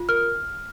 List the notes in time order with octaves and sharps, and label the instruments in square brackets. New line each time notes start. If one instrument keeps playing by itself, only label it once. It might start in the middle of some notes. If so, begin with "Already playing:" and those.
Already playing: [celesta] F4
A#4 F6